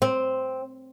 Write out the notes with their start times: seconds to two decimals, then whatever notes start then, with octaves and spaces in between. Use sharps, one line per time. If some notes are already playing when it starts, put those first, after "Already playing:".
0.02 C4